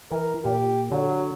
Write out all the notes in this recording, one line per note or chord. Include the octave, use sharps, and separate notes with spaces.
E3 A#4
A#2 G4
D3 F#3